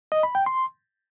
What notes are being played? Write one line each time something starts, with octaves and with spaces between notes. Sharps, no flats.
D#5
B5
G5
C6